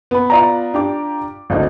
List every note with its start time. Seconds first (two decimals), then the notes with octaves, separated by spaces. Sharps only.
0.11 B3 B5
0.30 F4 D5 A#5
0.74 D4 G4 D6
1.50 G#1 D2 D#4